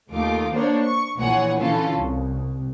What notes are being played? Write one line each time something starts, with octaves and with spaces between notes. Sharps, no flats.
D#2 A3 D#4 F4 D6
A#3 B3 D4 C5 C#5
C#6
A#1 A#2 E3 C#5 F#5 G#5
D3 E3 C#4 F4 A4
C2